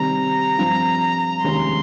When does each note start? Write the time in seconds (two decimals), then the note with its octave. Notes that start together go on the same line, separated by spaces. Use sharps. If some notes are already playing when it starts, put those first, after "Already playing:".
Already playing: C3 D#3 G3 C4 A#5
0.58 G2 F3 C4
1.44 F1 D#2 D#3 G#3 C#4 C6